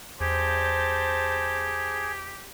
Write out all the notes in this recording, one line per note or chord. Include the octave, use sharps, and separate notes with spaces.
E2 G4 G#4 C5 A5